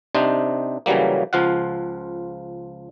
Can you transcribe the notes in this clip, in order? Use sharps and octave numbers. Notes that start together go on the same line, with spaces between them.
C3 D4 D#4 C5
C#3 E3 F#3 G3 A#3
C#2 F3 F4 F5 F#5